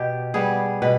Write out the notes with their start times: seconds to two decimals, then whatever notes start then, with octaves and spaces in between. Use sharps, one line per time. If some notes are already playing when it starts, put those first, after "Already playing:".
Already playing: B2 G4
0.34 G3 B3 G#4
0.82 B2 B4